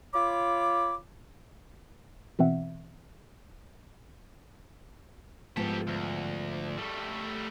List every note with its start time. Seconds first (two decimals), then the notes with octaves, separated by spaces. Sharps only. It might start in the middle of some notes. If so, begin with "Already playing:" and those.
0.14 F4 C#5 B5 D6
2.39 B2 E3 C4 E5 F#5
5.57 G#2 F3 B3 G4 A4
5.87 D2
6.77 G3 A3